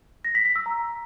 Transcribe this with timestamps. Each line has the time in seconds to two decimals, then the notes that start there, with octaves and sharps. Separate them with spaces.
0.25 A#6
0.35 B6
0.45 B6
0.56 E6
0.66 A#5